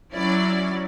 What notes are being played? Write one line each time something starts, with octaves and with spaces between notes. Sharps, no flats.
F#3 C#4 E4 D5